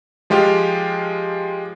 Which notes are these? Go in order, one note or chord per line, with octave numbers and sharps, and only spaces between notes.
F3 G#3 F4 G4